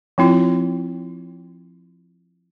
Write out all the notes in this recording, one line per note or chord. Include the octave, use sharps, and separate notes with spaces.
F3 C4 E4 F4